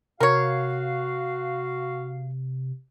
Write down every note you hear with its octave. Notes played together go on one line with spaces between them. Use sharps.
C3 F#4 A#4 C#5 F5